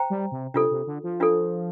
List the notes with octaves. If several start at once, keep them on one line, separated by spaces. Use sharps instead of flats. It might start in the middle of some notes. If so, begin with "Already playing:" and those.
Already playing: C5 G5 A#5
G3
C3
C3 D4 F4 A4
C3
D3
F3
D4 F4 A4